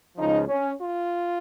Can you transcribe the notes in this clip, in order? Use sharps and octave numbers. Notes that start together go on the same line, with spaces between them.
C#2 C#3 F3 D#4
C#4
F4